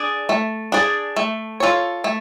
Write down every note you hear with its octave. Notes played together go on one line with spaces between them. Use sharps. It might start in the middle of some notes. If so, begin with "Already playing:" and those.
Already playing: D4 G#4 D5
A3
D4 G#4 D5
A3
F4 A4 C#5
A3